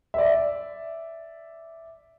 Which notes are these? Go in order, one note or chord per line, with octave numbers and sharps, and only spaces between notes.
D5 E5